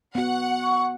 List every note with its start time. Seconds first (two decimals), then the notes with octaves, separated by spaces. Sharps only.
0.15 B3 F#4 F#5
0.62 C#6